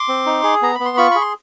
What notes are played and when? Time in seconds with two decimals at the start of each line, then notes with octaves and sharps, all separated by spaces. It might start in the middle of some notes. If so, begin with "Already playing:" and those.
Already playing: C6 D6
0.08 C4
0.26 D#4
0.43 G#4
0.62 B3 A#5
0.75 B5
0.80 B3
0.85 C6
0.97 F4 B5 C#6
1.11 G#4 B5
1.21 C6